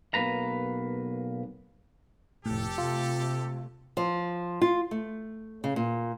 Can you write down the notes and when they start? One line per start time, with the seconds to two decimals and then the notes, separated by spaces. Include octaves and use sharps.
0.14 B1 C#3 A#3 B4 A#5
2.46 F1 A2 G4 A4
2.78 C3 A3 F4
3.97 F3
4.62 F4
4.91 A3
5.64 C#3
5.76 A#2